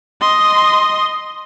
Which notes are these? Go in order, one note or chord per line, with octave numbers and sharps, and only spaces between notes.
D#5 C6